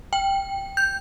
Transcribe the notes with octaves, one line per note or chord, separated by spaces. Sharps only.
G5
G6